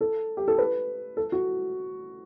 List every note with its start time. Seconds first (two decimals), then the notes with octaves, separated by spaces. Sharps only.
0.01 A4
0.37 G4
0.48 A4
0.58 B4
1.17 A4
1.32 F#4